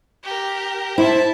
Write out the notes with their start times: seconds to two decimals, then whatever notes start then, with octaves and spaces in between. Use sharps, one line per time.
0.24 G4 A#4
0.98 E4 C5 E5 A5